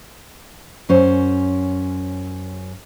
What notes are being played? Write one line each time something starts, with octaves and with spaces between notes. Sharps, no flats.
F#2 C#4 C5